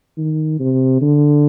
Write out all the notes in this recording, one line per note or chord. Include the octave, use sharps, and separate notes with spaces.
D#3
C3
D3